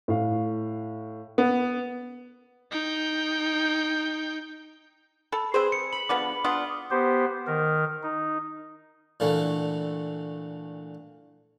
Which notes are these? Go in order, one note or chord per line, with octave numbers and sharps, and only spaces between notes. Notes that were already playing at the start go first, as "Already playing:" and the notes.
A2 F5
B3
D#4 G5
A4 B5
C4 G#4 B4 C5
C#7
B5 F#7
D3 F3 B3 D6
B3 D4 F4 D#6
B3 G4 C5
D#3 A#4
D#4
A#2 D3 E3 A3